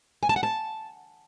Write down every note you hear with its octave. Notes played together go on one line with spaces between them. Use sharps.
G#5
A5
F#5
A5